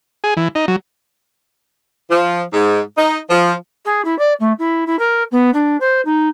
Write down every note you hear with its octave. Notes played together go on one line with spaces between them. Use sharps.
G#4
E3
D#4
F#3
F3
G#2
D#4
F3
G#4
E4
D5
A3
E4
E4
A#4
B3
D4
C5
D#4